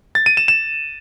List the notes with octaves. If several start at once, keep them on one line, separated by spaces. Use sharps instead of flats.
A6
D#7
E7
E7